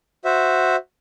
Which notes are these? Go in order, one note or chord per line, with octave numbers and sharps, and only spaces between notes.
F#4 C5 E5